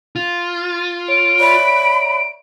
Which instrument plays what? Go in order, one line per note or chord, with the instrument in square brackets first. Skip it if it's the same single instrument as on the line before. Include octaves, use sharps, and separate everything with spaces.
[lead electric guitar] F4
[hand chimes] C#5 [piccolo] D7
[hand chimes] C#5 D5 E5 [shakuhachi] B5